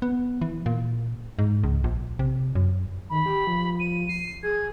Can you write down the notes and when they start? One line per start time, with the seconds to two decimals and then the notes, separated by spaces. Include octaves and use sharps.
0.02 B3
0.42 E3
0.66 A#2
1.39 G#2
1.64 C#2
1.84 A#1
2.19 C3
2.55 F#2
3.10 D#3 B5
3.26 G4
3.47 F3
3.80 D#7
4.09 C7
4.43 G#4 G#6